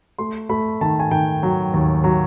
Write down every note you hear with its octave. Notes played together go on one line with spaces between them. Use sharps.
A3 C6
A3 B5
D#3 A5
G#5
D#3 G5
F#3
D#2
F#3